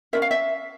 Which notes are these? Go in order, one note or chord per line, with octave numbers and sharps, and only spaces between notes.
C#4 F4 A#4 E5
F5
E5